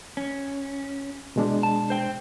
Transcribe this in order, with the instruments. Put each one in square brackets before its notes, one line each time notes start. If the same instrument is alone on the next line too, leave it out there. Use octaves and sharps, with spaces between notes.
[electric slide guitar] C#4
[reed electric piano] B2 G#3 D4
[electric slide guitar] A5
C5 G5